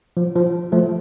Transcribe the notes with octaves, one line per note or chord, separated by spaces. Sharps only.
F3
F3
F3 A3